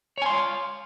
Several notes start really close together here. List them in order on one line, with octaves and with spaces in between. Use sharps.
C#5 G#5 C6 F5